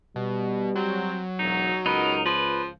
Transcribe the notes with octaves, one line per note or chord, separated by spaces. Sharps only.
B2 G3
F#3 C4
E1 D#4
C#2 B3 D#4 A#4
F3 B4